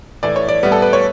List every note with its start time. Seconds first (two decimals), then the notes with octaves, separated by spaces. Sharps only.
0.23 A2 E3 A3 D5
0.36 C#5
0.48 D5
0.63 A2 G3 B3
0.72 A4
0.82 B4
0.93 C#5